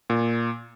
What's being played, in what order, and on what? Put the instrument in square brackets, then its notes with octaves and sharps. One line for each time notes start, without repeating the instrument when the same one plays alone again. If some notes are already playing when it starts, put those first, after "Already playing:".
[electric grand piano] A#2